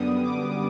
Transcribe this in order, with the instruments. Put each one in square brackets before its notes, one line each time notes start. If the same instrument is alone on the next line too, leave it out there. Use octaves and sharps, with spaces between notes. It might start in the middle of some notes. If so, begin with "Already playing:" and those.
Already playing: [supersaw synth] F#2 D3 G3 B3 D#6
D6